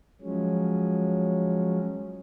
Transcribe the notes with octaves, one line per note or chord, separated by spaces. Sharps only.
F3 F#3 G#3 C#4